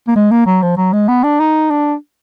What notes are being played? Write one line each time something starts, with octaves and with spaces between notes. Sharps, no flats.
A#3
G#3
A#3
F#3
F3
F#3
G#3
B3
D4
D#4
D4